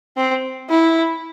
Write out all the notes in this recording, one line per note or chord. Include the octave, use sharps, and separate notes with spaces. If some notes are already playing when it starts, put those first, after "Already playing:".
C4
E4